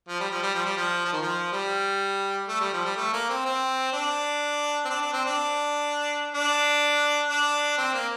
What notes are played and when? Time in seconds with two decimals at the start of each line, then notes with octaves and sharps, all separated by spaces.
0.08 F3
0.20 G3
0.31 F3
0.43 G3
0.54 F3
0.65 G3
0.77 F3
1.05 F3
1.13 D#3
1.22 F3
1.53 G3
2.48 A3
2.61 G3
2.73 F3
2.85 G3
2.97 A3
3.13 A#3
3.29 C4
3.46 C4
3.93 D4
4.85 C4
4.90 D4
5.02 D4
5.13 C4
5.26 D4
6.34 D4
7.30 D4
7.78 C4
7.94 A#3